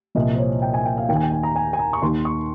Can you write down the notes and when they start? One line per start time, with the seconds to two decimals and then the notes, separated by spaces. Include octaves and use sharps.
0.15 C2 A#2 F3 D#5
0.33 C5
0.38 C#5
0.62 G5
0.74 G#5
0.85 G5
0.97 F5
1.09 D#3 G5
1.12 D#2 G#5
1.23 G5
1.32 G#5
1.43 A#5
1.56 G#5
1.73 G#5
1.79 A#5
1.93 C#6
2.02 D#2 D#3 C6
2.25 C#6